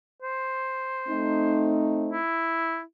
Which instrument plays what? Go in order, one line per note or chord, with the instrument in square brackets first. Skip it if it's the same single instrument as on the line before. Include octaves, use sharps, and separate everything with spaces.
[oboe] C5
[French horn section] A3 C4 D#4
[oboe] E4